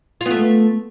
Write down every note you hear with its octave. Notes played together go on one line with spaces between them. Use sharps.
A3 B3 F4